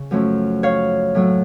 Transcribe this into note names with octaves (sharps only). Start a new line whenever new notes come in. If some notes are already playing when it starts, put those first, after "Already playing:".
Already playing: C#3
F#2 F3 A3 C#4
C#5 F5
A2 F#3 A3